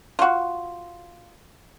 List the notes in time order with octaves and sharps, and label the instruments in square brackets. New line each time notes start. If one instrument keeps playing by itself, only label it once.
[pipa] F4 F#4